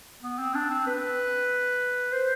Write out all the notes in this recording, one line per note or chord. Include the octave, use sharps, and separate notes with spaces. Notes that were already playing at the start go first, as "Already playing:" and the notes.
B3
C4
D4
C4
B4
C5